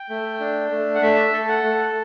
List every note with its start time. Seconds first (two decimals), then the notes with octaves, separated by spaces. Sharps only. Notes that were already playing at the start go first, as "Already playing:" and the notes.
Already playing: G5
0.10 A3
0.40 D4
0.71 A3
0.95 F#5
1.02 A3 E5
1.33 A4
1.48 F#5
1.63 A3